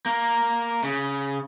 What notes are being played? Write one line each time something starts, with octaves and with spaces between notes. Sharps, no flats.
A#3
C#3